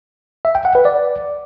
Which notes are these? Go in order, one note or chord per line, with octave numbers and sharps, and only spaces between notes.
E5
G5
F#5
B4
D5